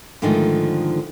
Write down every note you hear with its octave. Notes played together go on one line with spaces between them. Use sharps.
G#2 D3 D#3 F3 A3 D#4